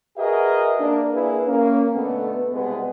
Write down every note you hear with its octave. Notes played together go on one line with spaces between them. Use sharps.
F#4 G#4 A#4 B4 D#5 E5
A#3 D4
A#3 E4 G#4 B4
A#3 C#4
B2 D3 A3 B3
C2 B2 G#3 B3